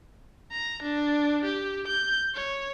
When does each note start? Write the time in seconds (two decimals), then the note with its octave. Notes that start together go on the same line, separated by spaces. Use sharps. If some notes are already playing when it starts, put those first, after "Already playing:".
0.52 A#5
0.83 D4
1.45 G4
1.88 G6
2.35 C#5